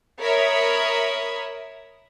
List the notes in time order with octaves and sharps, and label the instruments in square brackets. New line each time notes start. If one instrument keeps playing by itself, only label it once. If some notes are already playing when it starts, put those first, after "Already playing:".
[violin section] A#4 C#5 E5 B5 D#6